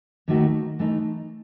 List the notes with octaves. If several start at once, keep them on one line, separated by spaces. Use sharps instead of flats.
D#2 D#3 A3 D#4 F#4
E3 A3 D#4